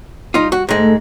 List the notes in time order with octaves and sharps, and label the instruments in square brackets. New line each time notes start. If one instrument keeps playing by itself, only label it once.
[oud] G3 [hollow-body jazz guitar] D#4 F4
[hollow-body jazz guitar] F#4
[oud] D2 A3 [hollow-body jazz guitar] G#2 G#3